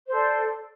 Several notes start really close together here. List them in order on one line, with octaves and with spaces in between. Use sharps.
C5 A4 D5